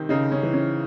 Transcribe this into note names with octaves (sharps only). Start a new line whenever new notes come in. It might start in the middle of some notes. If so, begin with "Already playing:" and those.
Already playing: C3 D#3
C#3 D#4
C#4
E3
C#4